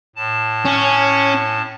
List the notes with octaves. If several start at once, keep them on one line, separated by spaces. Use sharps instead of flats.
A2 A5
C#4